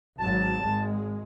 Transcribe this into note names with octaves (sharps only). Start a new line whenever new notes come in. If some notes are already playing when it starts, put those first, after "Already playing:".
G#1 F#3 A5
G#1 G#3